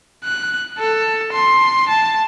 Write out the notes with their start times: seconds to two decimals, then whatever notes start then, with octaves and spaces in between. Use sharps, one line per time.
0.24 F#6
0.78 A4
1.33 C6
1.88 A5